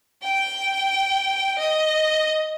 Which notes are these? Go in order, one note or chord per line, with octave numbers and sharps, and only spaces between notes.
G5
D#5